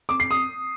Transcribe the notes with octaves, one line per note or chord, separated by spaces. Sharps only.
D6
C7
D#6